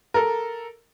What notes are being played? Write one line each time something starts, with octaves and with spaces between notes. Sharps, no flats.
A4 A#4